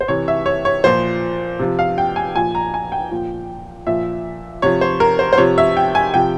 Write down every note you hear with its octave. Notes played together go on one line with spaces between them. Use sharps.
C5
C3 E3 C#5
E5
C#5
C#5
A#2 F3 C5
C3 F3
F5
G5
G#5
A#2 F3 G#5
A#5
G#5
G5
A#2 F3
A#2 F3 E5
C3 F3 C#5
C5
A#4
C5
C5
C3 F3 C#5
E5
G5
G#5
C3 F3 G5